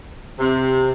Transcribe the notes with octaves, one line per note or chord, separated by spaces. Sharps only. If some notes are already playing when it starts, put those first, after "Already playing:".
C3